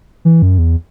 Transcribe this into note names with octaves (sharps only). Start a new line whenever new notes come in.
E3
F#2
E2